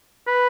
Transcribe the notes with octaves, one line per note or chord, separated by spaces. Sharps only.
B4